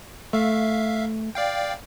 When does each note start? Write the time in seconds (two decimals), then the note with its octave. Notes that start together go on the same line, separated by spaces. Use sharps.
0.33 A3 E5 F5
1.35 D5 F5 G5